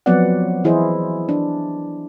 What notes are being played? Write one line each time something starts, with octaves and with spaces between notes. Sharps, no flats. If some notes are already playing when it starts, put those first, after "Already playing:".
F3 F#3 B3 C4 D5 F#5
E3 E4 G#4 C5 D#5
D4